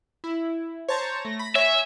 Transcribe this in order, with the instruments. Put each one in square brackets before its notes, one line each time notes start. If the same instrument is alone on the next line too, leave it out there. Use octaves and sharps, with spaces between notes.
[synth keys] E4
[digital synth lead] C5 [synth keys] C#5 A5 A#5
[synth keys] A3 [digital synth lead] A#6
[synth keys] B5
[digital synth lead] C#5 [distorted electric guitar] E5 [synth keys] G#5